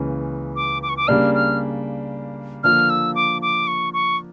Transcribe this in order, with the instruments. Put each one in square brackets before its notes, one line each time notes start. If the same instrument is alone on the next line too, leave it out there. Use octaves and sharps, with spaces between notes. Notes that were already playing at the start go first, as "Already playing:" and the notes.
Already playing: [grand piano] C#2 C#3 E3 A#3 C#4
[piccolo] D6
D6
C#6
D6
[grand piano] C#3 G3 A#3 D4 [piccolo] F6
[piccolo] F6
[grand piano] D3 F3 A#3 [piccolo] F6
[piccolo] E6
D6
D6
C#6
C#6